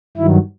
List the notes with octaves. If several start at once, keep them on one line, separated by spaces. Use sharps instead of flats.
G2 D#3 F#3 E4